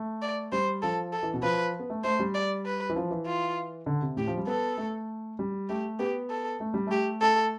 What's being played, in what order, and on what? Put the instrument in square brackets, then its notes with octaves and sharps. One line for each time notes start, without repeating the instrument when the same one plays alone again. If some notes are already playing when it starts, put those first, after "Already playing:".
Already playing: [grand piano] A3
[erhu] D5
[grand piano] G3 [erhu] C5
[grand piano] F3 [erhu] A4
[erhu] A4
[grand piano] E3
B2
[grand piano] F3 [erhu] B4
[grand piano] B3
A3
[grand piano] A3 [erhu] C5
[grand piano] G3
[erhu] D5
B4
[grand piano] E3
F3
E3
[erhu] F4
[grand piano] D3
C3
[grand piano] A2 [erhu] G4
[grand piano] F3
G3
[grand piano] B3 [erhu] A4
[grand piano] A3
G3
[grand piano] A3 [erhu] G4
[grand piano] B3 [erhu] G4
[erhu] A4
[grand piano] A3
G3
[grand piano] A3 [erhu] G4
[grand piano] A3 [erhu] A4